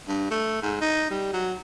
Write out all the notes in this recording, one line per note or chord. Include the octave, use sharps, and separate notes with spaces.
G2
A3
G#2
D#4
G3
F#3